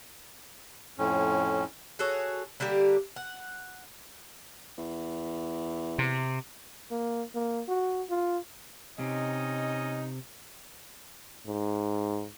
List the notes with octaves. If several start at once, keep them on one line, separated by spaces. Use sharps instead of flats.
F2 A2 C#4
F#4 G#4 A4 C#5
D3 G3 A#3 G4
F#5
E2
C3
A#3
A#3
F#4
F4
C3 C#4 D#4 D#5
G#2